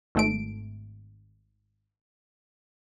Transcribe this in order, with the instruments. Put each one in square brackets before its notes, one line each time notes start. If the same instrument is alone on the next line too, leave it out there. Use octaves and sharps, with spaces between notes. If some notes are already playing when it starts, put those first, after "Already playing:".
[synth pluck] G#1 A3 D7